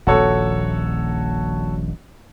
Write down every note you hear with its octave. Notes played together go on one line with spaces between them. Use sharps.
D#1 A#1 F#4 A4 C#5